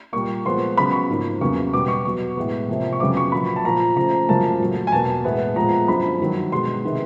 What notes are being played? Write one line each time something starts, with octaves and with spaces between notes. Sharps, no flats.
A#2 G3 A#3 C#6
A#2 F3 G#3 B3 C6
C#3 F#3 B3 B5
C#6
G#2 F3 A#3
E2 C#3 F#3 A#3 C#6
B2 G3 B3 D6
C#6
B2 F#3 B3 C#6
A2 E3 G#3 B3
C3 F3 A#3
C#6
F2 C#3 F#3 B3 D6
C#6
A#2 F#3 B3 B5
A5
A#2 F3 A#3 A#5
C#3 F3 A3 A#5
F#2 C#3 F3 A#3 A5
A#2 F#3 A3
G#5
E2 B2 F#3 A#3 A5
A2 E3 G#3 B3
A#2 F3 G#3 B3 A#5
F#2 D3 F3 B5
G2 D#3 F#3
B2 G#3 B3 C6
C3 D#3 G#3 B3